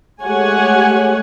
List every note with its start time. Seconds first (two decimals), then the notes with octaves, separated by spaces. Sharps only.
0.23 G#3 A3 G4 C#5 F#5 G#5